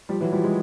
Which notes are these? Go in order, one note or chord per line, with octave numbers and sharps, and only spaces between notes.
F3 G3
E3 F#3
F3 G3
F#3 G#3